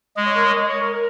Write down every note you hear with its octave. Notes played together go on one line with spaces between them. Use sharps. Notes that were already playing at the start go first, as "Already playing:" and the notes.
G#3 D#5
C#5
A#4
C#5
D#5
C#5
A#4
A#4